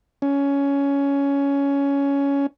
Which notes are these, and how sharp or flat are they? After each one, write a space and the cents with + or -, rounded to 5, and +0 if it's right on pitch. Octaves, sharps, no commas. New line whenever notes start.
C#4 +15